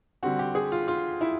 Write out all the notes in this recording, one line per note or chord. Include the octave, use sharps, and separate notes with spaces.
D3 G3 C4 F#4
G4
G#4
F4
F4
E4